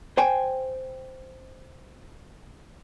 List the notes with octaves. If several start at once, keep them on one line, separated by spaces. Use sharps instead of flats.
C5 G5 G#5